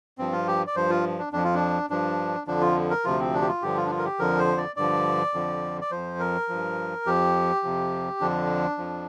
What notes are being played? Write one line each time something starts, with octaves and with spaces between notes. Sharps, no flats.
G2 F3 C4
F4
G4
D5
G2 F3 C5
F4
D4
F2 F3 D4
F4
D4
G2 F3 D4
F2 D3 F3 D4
F4
A#4
D2 C3 F3 F4
C4
D4
G4
F4
G2 D3 F3 G4
F4
D4
F4
A#4
G4
F2 D3 F3 A#4
C5
D5
G2 D3 F3 D5
F2 D3 F3
D5
F2 F3 C5
A#4
G2 F3
F2 F3 G4
F2 C3 F3
F2 D3 F3 D4
F2 F3